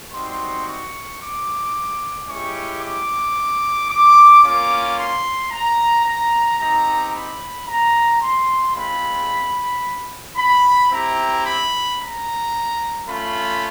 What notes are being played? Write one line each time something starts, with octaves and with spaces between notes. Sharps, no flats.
G3 C4 D#4 F#4 C6
C#6
D6
G#3 C#4 E4 G4 C#6
D6
D6
A#3 C#4 F4 D6
C6
A#5
A#5
C4 D#4 G4 A#5
B5
A#5
C6
G#3 C4 F4 B5
B5
C4 E4 G4 A#5
B5
A#5
A3 C#4 F4 B5